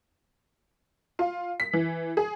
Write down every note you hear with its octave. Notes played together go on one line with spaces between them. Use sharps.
F4
B6
E3
G#4